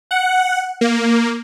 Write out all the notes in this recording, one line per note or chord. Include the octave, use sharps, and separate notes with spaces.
F#5
A#3